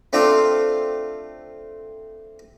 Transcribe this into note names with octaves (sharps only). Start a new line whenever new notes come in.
A3 C4 D4 F4